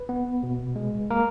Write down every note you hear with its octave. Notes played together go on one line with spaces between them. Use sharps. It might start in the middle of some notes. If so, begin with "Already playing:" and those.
Already playing: B4
B3
B2
G#3
A#3 A#4